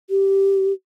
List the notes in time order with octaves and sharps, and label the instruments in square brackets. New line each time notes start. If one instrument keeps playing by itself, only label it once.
[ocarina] G4